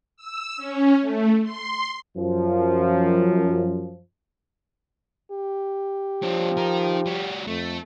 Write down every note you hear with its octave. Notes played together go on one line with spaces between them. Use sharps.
E6
C#4
A3
C6
F#2 F3
G4
F3 C4 D4
D#4 A#4
G3 F#4
F2 A3